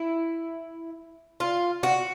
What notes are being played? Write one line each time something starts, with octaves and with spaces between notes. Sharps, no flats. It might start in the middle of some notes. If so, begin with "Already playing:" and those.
Already playing: E4
F4
F#4